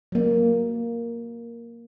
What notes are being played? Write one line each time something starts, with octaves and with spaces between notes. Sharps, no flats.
F#3 A#3